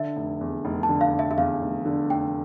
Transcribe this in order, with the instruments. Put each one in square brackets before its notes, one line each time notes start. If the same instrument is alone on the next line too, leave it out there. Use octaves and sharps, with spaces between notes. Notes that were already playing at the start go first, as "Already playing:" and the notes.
Already playing: [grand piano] D3 [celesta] E5
[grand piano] F1
E2
F1
[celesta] A5
[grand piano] D3
[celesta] F5
[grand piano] F1
[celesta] E5
E5
[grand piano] E2 [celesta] F5
[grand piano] F1
D3
[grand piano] F1 [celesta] G5